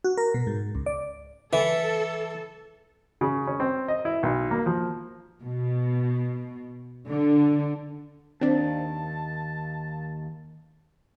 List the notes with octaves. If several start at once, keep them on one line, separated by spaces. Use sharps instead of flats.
F#4
A#4
B2
G#2
C#2
D5
E3 A4 E5
C#3
C#4
C4
D#5
E4
B1
A#3
F3
B2
D3
D#2 C4 D4 A5